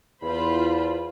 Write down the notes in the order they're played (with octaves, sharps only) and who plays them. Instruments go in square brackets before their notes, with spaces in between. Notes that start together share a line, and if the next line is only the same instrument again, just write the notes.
[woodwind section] E2 [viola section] F4 C5 B5